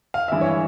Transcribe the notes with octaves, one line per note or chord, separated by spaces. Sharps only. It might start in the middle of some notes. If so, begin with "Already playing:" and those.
F5
G2 E3 G#3 E4 E5
C#5